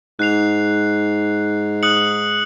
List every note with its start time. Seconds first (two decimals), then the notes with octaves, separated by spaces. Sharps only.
0.19 G#2 F#6 C7 F7
1.83 D#6 F#6 C#7 F#7